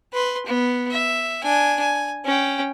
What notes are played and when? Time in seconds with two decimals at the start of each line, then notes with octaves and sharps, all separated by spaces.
0.13 B4 C6
0.46 B3
0.90 E5
1.43 D4 G#5
1.80 G#5
2.25 C#4 G5